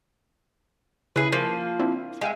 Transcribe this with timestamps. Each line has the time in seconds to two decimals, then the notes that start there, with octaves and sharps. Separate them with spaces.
1.16 C#3 E4 G#4 B4
1.32 F3 A#3
1.79 C4 D4 E4
2.21 G#3 E5 F5 G5